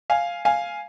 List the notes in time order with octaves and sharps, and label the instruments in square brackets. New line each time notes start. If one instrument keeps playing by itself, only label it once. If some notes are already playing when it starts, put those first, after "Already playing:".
[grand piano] F5 G#5
F5 G#5